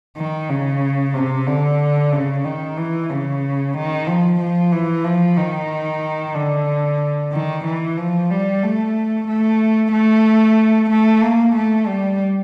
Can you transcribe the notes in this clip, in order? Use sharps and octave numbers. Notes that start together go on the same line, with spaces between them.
D#3
C#3
C3
D3
C#3
D#3
E3
C#3
D#3
F3
F3
E3
F3
D#3
D3
D#3
E3
F3
G3
A3
A3
A3
A3
A#3
A3
G3